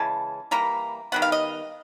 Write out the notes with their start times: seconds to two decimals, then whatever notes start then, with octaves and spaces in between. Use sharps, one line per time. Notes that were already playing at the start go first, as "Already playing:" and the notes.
Already playing: C#3 E3 G#3 A5
0.51 E3 G3 A#3 A#5
1.12 D#3 G3 B3 F#5
1.22 F5
1.32 D#5